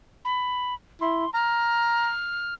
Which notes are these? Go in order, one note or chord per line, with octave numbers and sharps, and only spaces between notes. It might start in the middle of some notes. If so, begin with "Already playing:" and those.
B5
E4 C6
A#5 F6